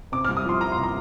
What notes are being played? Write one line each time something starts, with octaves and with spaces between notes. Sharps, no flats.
C3 D6
F6
C2
D#6
F3 C6
C2 A#5
C6
C3
A#5